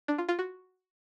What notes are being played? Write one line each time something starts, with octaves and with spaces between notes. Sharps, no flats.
D4
F4
F4
F#4